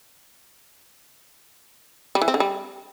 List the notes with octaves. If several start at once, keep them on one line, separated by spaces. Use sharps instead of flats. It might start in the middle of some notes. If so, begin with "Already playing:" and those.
G3
E3
C4
D3
G3